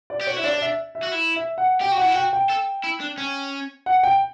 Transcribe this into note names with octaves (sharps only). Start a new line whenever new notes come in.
D5
G4
F#4 C#5
E4 E5
D4 D5
D5
E5
E5
F#4
E4
E5
F#5
G4 G5
F#4
E4 F#5
F#4 G5
G5
A4
E4
D4
C#4
F#5
G5